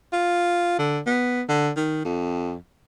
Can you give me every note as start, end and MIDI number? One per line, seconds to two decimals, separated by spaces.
0.13 0.78 65
0.78 1.00 50
1.06 1.42 59
1.49 1.71 50
1.76 2.03 51
2.05 2.55 41